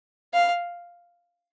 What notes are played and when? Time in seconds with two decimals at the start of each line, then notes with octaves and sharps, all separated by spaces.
0.34 F5